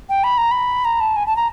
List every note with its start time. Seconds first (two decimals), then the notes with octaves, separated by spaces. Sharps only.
0.09 G5
0.24 B5
0.38 A#5
0.51 B5
0.85 A#5
1.00 A5
1.16 G#5
1.26 A5
1.36 A#5